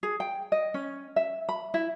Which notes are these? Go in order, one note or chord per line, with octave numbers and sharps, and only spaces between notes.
G#4
G5
D#5
C#4
E5
B5
E4